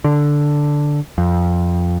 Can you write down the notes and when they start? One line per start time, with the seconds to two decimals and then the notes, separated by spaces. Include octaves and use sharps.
0.04 D3
1.18 F2